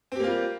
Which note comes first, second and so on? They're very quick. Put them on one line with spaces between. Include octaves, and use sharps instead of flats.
C4 G4 A#3 F4 G3